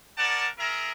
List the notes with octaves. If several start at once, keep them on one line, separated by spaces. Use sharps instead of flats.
C#4 A#4 D5 F#5 A5
F4 G#4 A#4 E5 A#5